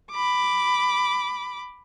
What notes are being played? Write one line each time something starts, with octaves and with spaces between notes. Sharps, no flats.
B5 D6